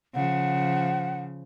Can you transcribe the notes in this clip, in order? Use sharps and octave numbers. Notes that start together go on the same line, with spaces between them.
C#3 F3 F#5